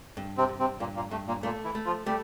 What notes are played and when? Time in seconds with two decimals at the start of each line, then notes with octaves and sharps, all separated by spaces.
0.17 G2
0.38 C3 C4
0.48 G2
0.59 C3 C4
0.80 G2 A#2 A#3
0.96 A#2 A#3
1.11 G2 A3
1.28 A#2 A#3
1.43 A#2 A3 A#3
1.64 E3 E4
1.75 A3
1.86 F3 F4
2.06 G3 A3 G4